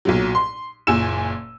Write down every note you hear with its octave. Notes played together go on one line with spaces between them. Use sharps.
B1 A#2 F#3
C6
F#1 A#2 G#5 E6 E7